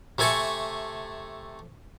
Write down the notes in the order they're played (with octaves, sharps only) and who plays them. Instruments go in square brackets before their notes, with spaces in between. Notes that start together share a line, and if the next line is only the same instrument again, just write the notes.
[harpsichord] C3 A3 A4 G#5 C#6